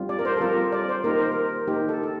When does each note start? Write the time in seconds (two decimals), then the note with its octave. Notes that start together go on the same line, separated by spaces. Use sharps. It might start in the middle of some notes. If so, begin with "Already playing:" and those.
Already playing: G3 C4 F4
0.09 D5
0.19 A#4
0.25 C5
0.37 A4
0.41 G3 C4 F4 A#4
0.72 D5
0.89 C5
1.04 A#3 D#4 G4 A#4
1.18 C5
1.32 A#4
1.67 A#3 D#4 G4
1.89 A4
2.03 A4